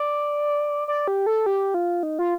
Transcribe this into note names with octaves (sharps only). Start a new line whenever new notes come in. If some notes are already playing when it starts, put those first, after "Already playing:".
Already playing: D5
D5
G4
A4
G4
F4
D#4
F4